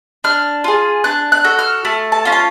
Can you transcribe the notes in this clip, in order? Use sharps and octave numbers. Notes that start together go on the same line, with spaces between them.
D4 F6
F4 G#4
D4 F#6
F#6
F#4 A4
F6
A3
A5
C#4 F4
A5